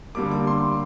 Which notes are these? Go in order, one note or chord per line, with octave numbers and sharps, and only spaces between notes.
D3 G3 A#3 D6
D6
C6